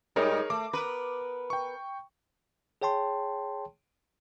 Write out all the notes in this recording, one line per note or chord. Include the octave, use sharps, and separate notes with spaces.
G#2 G3 D#4 G#4 A#4 C#5
A3 D6
B3 A#4 B4
G5 C#6
G#4 C#5 G5 A5 C6